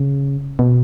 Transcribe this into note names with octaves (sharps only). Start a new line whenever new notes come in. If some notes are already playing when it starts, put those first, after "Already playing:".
Already playing: C#3
B2